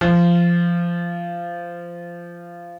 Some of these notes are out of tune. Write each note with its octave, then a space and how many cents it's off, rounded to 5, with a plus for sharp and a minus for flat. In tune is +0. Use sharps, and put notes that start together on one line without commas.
F3 -15